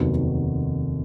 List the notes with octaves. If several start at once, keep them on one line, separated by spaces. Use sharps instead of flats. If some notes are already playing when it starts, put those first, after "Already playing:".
Already playing: F1 D#2 D#3 F#3 B3